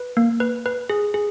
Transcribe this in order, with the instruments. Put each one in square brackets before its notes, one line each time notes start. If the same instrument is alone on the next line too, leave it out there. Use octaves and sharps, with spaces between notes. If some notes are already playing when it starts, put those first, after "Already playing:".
Already playing: [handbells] B4
A#3
B4
B4
G#4
G#4